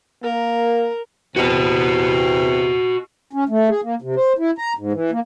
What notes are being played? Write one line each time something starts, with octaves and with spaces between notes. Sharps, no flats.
A#3 A#4
E2 C3 F#4 D#5
C#4
A3
G#4
A#3
C3
C5
E4
A#5
G#2
E3
A#3